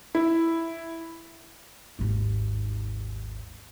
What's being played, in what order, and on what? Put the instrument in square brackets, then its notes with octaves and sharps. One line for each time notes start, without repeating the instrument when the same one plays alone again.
[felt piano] E4
[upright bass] G#1 D#2